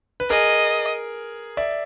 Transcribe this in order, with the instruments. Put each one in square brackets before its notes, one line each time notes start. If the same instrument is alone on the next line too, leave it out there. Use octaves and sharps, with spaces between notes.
[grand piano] B4
[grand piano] G#4 A#4 [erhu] D#5
[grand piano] D5 E5